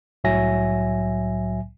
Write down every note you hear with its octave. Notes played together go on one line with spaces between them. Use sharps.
C2 A2 F#3 E5 G#5 A#6